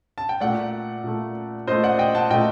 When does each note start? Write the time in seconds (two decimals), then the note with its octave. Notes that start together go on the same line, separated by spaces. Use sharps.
0.18 A5
0.29 G5
0.41 A#2 A3 D5 F#5
1.04 A#2 A3
1.67 A#2 A3 C5 D#5
1.83 D5 F#5
1.99 D#5 G5
2.15 F#5 A5
2.30 A#2 A3 D#5 G5